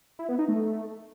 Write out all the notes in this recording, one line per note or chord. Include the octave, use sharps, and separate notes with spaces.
E4
B3
D#4
A3